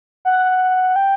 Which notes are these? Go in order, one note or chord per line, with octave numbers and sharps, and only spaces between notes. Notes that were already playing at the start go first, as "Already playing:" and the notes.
F#5
G5